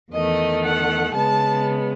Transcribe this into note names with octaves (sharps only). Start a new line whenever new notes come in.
E2 D#3 A3 D#5
F#5
C#3 G#3 B3 A5